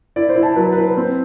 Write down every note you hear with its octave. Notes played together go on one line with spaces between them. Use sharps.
E4 D5
C5
E4
A5
F#3 B4
E4 B4
C4